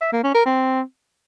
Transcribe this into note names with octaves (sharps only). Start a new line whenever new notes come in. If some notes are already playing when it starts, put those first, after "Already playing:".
E5
A#3
C#4
A#4
C4